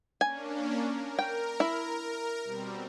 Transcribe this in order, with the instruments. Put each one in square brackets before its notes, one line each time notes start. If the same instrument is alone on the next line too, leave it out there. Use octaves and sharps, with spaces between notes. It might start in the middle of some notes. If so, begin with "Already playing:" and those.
[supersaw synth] A#3 C#4 D4 [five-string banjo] G#5
[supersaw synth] A#4
[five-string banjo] G5
E4
[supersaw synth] B2 G3 C4